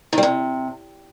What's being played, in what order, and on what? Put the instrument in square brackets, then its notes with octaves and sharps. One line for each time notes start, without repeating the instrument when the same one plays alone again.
[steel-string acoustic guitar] D#3
G3
C3